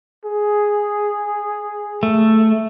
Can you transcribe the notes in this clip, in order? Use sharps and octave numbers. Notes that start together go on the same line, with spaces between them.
G#4
A3